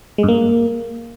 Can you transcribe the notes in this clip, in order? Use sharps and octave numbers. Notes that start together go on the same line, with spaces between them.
G#3
G2
A#3